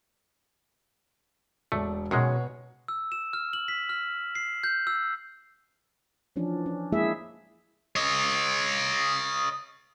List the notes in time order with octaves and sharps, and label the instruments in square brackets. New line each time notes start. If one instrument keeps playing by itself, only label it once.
[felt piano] E1 D5 [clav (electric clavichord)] A3
[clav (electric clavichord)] F#2 D#3 G#3 [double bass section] B2 [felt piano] C#5 F#5 G#5
[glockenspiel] E6
E7
F6
F#7
B6
F6
C7
G6
E6
[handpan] E3 F3 C#4 D4
C#4
G#3 A#3 E4 G#4 E5
[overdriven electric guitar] C#5 D#5